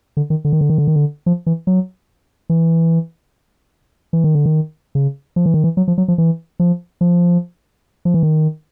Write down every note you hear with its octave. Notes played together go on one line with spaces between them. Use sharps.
D3
D#3
D3
D#3
D3
D#3
D3
D#3
D3
F3
E3
F#3
E3
E3
D#3
D3
D#3
C#3
F3
E3
D#3
E3
F#3
F3
F#3
F3
E3
F3
F3
F3
E3
D#3